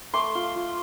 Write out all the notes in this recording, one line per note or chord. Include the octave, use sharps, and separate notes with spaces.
A3 C6 D6
F4
F4